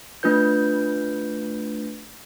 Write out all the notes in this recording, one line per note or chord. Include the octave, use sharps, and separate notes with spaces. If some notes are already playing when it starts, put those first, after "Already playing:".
A3 D4 F4 B4 G6